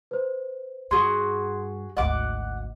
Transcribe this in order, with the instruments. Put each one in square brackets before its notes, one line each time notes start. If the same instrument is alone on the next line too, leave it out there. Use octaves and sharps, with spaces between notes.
[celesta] B4 C5
[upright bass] G2 [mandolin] F#4 G#4 [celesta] C6 D#6
[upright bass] G#1 D2 [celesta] D#5 [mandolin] F#5 D6